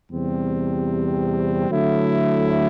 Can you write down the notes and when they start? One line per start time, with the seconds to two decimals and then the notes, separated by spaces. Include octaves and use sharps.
0.10 E2 C3 G3 C4
1.68 D3 F#3 A3 E4